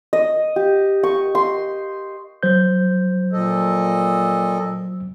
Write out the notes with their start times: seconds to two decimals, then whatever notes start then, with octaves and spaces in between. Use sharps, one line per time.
0.13 D#5
0.56 G4
1.03 C#6
1.35 C6
2.43 F#3 C5 G6
3.33 A#2 A4 D#5